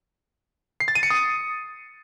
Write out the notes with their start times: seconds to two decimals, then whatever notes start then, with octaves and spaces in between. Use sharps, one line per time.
0.80 C7
0.88 A6
0.95 D#7
1.03 C#7
1.10 D#6